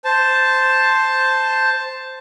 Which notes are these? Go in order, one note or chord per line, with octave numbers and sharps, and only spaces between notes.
C5 A5